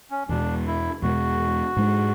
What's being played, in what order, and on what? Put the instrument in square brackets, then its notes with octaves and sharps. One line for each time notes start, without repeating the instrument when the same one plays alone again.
[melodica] C#4
[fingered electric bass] E2 B2 G#3 [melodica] D4
[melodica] E4
[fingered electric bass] E2 B2 G#3 [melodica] F#4
[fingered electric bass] G#2 G#3 D4